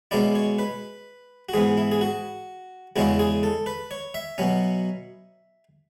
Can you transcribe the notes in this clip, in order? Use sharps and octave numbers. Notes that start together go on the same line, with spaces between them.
B2 G#3 C#4 E4 D5
C#5
B4
F#4
G#2 E3 B3 G#4
E4
G#4
F#4
E2 C#3 G#3 C#4 E4 F#4
G#4
A4
B4
C#5
E5
B2 F#3 C#4